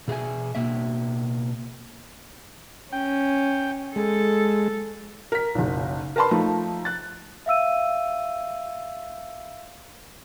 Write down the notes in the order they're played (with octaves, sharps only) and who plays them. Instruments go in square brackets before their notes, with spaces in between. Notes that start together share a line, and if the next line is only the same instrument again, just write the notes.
[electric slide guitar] B2 G#4 E5 G#5
B2 A#3 E5
[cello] C#4 [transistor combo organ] G5
[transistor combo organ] G#3 [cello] A4
[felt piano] A#4 B6
F#1 B1
A#4 B4 A5 B5 C6
F3 A3 D#4
F#6 A6
[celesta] E5 F5 E6 D#7